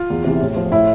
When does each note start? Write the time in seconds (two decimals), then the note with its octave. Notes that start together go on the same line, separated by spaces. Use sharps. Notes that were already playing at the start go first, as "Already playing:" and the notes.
Already playing: F4
0.10 E2
0.25 C3 E3
0.41 A2
0.56 F3
0.72 A2 E4